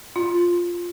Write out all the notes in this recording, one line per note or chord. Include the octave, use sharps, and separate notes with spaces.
F4